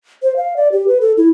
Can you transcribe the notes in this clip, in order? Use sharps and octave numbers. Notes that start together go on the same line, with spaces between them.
C5
F5
D5
G4
B4
A4
E4